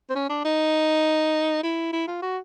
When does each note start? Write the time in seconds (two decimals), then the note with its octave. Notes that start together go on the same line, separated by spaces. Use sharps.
0.10 C4
0.15 C#4
0.30 D4
0.45 D#4
1.63 E4
1.93 E4
2.07 F4
2.22 F#4